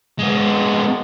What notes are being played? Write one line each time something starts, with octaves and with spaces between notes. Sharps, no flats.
G#3 B3